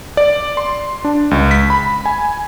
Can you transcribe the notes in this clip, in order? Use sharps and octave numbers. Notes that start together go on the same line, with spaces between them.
D5
C6
D4
C#2
B6
B5
G#5